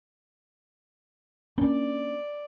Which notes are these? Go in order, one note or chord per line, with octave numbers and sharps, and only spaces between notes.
A#3 C#4 D4 D5